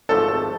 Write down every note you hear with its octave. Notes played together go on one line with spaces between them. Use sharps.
G#1 G#2 F3 A3 A4
A4